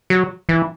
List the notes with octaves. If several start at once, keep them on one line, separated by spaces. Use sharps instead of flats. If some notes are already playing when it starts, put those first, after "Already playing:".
F#3
E3